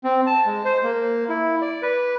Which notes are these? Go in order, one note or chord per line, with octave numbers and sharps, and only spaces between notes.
C4
A5
G#3
C5
A#3
E4
D5
B4